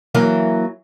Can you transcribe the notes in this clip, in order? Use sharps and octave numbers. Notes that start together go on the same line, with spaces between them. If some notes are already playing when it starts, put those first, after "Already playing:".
E3 F#3 A#3